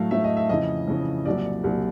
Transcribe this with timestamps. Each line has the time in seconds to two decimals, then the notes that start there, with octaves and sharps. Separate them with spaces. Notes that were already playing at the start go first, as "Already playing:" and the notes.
Already playing: A2 F#3 A3 F5
0.11 A2 F#3 A3 E5
0.24 D#5
0.37 E5
0.49 F2 C#3 E3 D#5
0.88 F2 C#3 E3
1.26 C2 A#2 F#3 D5
1.64 C2 A#2 F#3